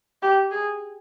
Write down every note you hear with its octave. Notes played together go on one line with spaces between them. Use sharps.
G4
G#4